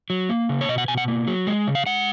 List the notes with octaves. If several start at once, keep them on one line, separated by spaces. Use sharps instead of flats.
F#3
A#3
C#3
C#5
B2 D#5
F#5
B2 G#5
F#5
A#3
F#3
G#3
C#3
F5
G#3 F#5